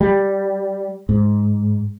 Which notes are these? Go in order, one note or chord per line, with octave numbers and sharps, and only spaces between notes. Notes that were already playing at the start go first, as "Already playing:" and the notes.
G3
G#2